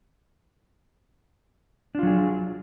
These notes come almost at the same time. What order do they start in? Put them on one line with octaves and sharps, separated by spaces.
D4 F4 F#3 G#4